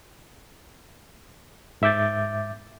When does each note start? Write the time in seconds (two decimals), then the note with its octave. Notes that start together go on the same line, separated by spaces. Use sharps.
1.82 G#2 E5 D6 G6 A6